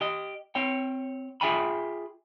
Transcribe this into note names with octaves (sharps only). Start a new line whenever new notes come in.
G4 D#5
C4 C#5 G5
F4 G#4 E5 G5 G#5 B5